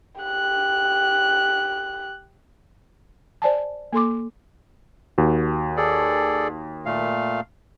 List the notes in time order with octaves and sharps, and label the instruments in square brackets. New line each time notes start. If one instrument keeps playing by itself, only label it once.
[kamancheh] G4 F#6
[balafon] C5 D5 G#5 A5
A#3 A4 C6 D6
[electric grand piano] D#2 F#4
[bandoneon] G#4 A4 D5
A#2 A3 F5